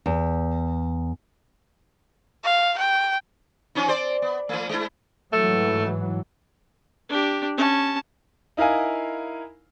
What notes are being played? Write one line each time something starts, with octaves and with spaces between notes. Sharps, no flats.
E2
F5
G5
F3 C#4 D#4
C4 C5 D5
B3
F3 A3
G#3 E4
G#2 E3 F#3 A3
D4 G4
C#4 A5
D#4 E4 A#4 F5 G#5